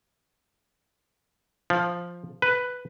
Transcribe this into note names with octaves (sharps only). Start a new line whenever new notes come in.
F3
B4